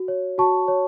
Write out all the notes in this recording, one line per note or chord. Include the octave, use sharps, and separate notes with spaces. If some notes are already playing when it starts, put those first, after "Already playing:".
Already playing: F#4
C#5
F#4 A5 C#6
C#5